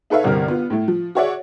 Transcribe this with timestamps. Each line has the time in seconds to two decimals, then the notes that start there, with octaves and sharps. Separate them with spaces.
0.10 D#4 A4 B4 C#5 E5 F5
0.24 G1 C2 C4 G4 A#4 F6
0.48 B3 F4
0.70 A2 A3
0.88 F3
1.15 F#4 G#4 C#5 D5 E5 F#5